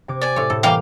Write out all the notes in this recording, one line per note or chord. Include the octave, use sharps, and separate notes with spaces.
C3 D6 G#6
D5 G#5
A2 C#5
A2 A4
E3 G3 A#3 F5 G5 D6